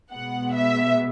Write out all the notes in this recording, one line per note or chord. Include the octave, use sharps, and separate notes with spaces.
B2 G#3 B3 F#5
E5